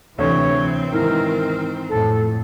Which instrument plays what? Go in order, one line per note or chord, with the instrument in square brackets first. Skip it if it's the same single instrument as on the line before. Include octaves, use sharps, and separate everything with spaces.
[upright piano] D2 [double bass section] C3 E3 [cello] C4 [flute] C#5
[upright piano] G#2 E3 [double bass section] D#3 [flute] A#4
[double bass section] F2 A2 [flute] A4